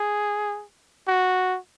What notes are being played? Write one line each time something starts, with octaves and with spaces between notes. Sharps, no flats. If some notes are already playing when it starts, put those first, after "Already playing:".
Already playing: G#4
F#4